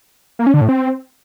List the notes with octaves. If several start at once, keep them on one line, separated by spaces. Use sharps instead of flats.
A#3
C#4
D3
A2
C4